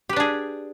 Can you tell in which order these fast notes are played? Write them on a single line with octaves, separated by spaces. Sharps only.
G4 B4 D4 G#4